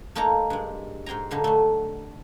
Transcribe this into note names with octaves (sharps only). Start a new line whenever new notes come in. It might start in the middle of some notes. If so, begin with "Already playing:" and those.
A3 A#3 D#4 A4 A#5
G2 G#3
G#2 C5 G5 G#5 A#5
A#2 D3 G3 D#4
F#3 A3